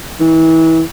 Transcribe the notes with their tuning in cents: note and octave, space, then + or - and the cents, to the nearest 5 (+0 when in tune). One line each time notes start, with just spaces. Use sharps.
E3 -30